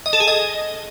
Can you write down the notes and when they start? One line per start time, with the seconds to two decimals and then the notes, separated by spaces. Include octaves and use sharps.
0.06 D#5
0.13 A4
0.20 G#4
0.28 D#5